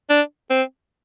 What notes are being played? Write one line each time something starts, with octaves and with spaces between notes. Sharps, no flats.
D4
C4